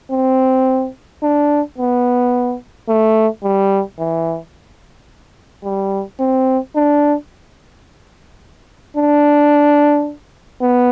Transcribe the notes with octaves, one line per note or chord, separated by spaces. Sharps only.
C4
D4
B3
A3
G3
E3
G3
C4
D4
D4
B3